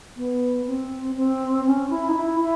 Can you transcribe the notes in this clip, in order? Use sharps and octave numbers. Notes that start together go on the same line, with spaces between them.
B3
C4
C4
C#4
E4
D#4
E4
E4